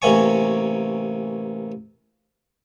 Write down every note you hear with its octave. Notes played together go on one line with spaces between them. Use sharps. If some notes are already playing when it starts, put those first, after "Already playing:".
A1 C3 A#3 C#5 G#5 C#6